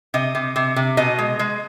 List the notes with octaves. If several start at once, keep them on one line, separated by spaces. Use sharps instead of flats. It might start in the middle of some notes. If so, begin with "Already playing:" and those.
C3 D#5
C3
C3
C3
B2 D#5
G#3
G#3